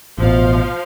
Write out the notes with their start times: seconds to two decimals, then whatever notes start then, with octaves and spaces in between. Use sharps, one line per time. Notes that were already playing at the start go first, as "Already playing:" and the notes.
0.18 A1 B2 F3 F5